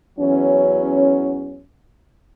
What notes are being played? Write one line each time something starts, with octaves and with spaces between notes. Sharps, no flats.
E2 E3 F#3 C#4